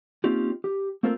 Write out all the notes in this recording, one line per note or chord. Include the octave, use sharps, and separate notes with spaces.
A#3 C4 C#4 D#4 F4 G4
G4
A3 A#3 C4 F4 A4 A#4